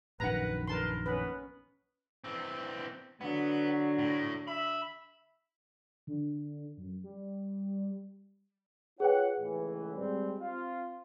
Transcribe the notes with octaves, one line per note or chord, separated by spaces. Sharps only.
A#1 F#2 D#3 B4 F#5 A#5
A#4 B4 A5 C6
B3 C#4 B4
E3 C4
D3 F#3 B3
A2
E5 B5
D3
F#2
G3
F4 G#4 B4 C#5 F#5 G5
C#2 A2 E3
G3 G#3 C4
C4 F4